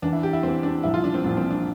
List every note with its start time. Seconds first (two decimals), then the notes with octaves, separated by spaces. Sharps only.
0.02 E2 E3 D4
0.13 E4
0.23 G4
0.33 E4
0.43 E2 E3 C4
0.63 D4
0.83 C2 A#2 F3 E4
0.94 F4
1.04 D4
1.14 C4
1.24 C2 A#2 F3 D4
1.37 C4
1.50 D4